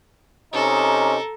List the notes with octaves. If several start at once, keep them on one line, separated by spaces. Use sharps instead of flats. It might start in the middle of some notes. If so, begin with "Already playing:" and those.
C3 C#4 D#4 A4 A#4